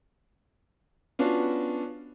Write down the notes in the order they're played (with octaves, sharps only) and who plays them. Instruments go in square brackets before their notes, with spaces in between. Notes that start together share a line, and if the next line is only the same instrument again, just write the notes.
[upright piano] B3 C#4 D4 F4 F#4